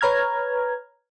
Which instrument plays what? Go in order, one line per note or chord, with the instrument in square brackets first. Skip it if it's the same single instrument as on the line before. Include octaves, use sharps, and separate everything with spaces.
[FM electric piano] B4 C#5 A#5 F6 G#6